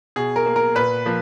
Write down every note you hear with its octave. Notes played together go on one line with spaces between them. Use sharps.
B2 G#4
A#4
A#3
A#4
A#2 B4
F3 A#3